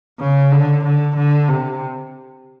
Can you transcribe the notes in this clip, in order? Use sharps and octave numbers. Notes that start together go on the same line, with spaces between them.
C#3
D3
D3
D3
C3